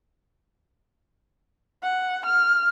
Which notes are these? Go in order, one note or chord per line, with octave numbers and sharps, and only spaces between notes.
F#5
F6